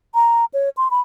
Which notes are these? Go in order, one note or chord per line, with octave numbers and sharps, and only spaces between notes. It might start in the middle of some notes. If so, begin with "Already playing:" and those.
A#5
C#5
C6
B5